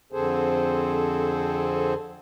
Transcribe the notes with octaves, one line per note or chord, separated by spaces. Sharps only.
F2 D3 C4 G#4 A4 C5